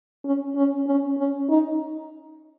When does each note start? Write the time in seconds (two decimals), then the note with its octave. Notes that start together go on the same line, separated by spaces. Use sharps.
0.25 C#4
0.56 C#4
0.87 C#4
1.18 C#4
1.50 D#4